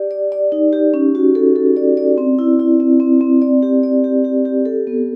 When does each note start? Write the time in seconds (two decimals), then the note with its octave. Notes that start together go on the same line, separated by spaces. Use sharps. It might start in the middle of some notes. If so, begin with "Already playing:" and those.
Already playing: G4 D5
0.11 D5
0.32 D5
0.52 D#4
0.73 G4
0.94 C#4
1.15 F#4
1.35 A4
1.55 A4
1.77 D5
1.97 D5
2.18 C4
2.39 E4
2.59 E4
2.80 C4
3.00 C4
3.21 C4
3.42 D5
3.63 G4
3.83 D5
4.04 G4
4.25 G4
4.45 G4
4.65 A4
4.87 B3